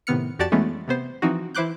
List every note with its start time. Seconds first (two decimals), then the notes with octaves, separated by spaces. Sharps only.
0.07 A2 C3 D#3 B3 F6 C#7
0.39 F2 F#4 G4 D5 A5 A6
0.52 E3 G#3 A3 B3 C#4
0.88 C3 B3 C5
1.22 E3 F3 C4 D#4 F#4
1.55 E3 E4 C5 D6 F#6 G6